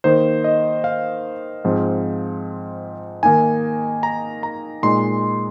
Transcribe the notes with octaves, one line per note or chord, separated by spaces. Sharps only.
D#3 A#3 D#4 C5
D#5
F5
G#2 F3 C4
D#3 A#3 D#4 G#5
A#5
A#5
A#2 G#3 D#4 C6